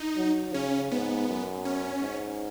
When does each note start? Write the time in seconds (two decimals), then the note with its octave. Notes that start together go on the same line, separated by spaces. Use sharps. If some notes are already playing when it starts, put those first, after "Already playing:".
Already playing: D#4
0.17 F#3
0.53 C#3 C#4
0.91 G#2 B3
1.29 F#2
1.65 C#4
2.02 G#2